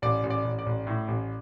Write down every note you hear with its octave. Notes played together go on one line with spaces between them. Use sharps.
A1 D5
A1
D5
A1
D5
A1
A2
A1